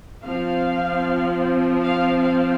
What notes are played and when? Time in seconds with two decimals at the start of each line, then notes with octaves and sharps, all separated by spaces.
0.25 F3 C4 F5
1.82 F5
2.20 F5